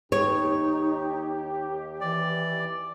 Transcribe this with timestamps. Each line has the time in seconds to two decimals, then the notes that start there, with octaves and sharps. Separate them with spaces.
0.12 D#2 D#4 G4 C#5
2.01 E3 D5